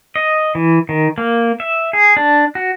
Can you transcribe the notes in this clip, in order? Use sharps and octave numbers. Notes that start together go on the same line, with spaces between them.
D#5
E3
D#3
A#3
E5
G#4
D4
F#4